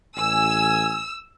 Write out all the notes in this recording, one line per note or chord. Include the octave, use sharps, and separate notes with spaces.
A1 G#5 E6